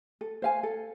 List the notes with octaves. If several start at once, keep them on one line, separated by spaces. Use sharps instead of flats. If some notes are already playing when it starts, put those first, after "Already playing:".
A4
C5 F5 G#5
A4